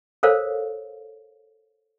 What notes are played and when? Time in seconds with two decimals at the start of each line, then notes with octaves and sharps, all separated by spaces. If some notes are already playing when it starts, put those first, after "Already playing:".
0.23 A4 A#4 C5 C#5 F5